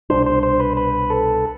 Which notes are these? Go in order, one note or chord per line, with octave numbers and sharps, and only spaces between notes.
C2 B2 G3 D4 C5
C5
C5
B4
B4
A4